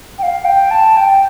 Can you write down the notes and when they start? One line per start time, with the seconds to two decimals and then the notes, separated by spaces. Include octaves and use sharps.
0.18 G5
0.23 F5
0.45 G5
0.71 A5
0.97 G5